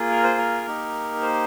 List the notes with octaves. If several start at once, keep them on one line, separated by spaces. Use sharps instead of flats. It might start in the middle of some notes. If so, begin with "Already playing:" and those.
Already playing: A#3 F4 G#4
A#4
C5
A#4
A#3 D#4 G4
C5